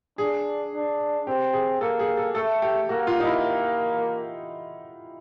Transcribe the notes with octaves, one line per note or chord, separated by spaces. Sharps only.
D4 G#4
D4
C4 G4
G#4
A#3 A4
G#4
A4
A3 A4
G4
A#3 F#4
F4
D#4
E4